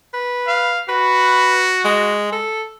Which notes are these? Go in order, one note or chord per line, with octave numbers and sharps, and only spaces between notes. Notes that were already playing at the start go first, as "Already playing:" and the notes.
B4
F5
F#4 B4
G#3
A4